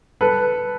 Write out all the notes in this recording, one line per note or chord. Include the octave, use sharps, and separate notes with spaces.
A4 B4